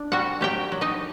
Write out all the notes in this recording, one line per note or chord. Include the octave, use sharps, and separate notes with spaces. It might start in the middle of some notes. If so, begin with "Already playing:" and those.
Already playing: D4
G3 F#4 F#5
F#3 G4 G5
F#3
D#4 D#5